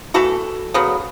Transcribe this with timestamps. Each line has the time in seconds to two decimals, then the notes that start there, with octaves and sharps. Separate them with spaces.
0.14 E3 A3 F#4 A4
0.74 C#3 F#3 B3